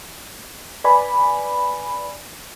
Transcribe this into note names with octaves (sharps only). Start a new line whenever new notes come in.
B4 D5 G#5 B5